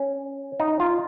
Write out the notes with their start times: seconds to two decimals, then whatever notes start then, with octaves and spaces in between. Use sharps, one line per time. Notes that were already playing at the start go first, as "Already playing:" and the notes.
Already playing: C#4
0.60 D#4
0.80 F4